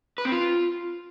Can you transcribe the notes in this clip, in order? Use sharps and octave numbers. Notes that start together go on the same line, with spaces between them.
B4
C4
F4